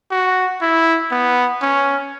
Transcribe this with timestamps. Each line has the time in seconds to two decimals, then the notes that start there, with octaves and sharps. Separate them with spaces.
0.11 F#4
0.61 E4
1.11 B3
1.62 C#4